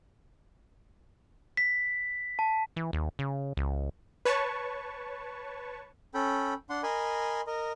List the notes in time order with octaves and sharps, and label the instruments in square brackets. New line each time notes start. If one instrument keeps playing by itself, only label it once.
[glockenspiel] B6
A5
[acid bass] E3
D#2
C#3
C#2
[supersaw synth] B4 C#5 A5 C#6
[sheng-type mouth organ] C#4 A4 G5 B5
D4 F#5 C6
A#4 D#5 G#5 B5 C6
A#4 D#5